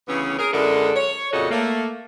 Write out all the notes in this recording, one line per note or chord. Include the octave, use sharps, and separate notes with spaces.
D2 C#3 E3 B3 C#4
G#4 A#4
F#2 D3 G#3 E4 A4 A#4
C#5
F2 A#2 C#3 F#4 A4 D#5
A3 A#3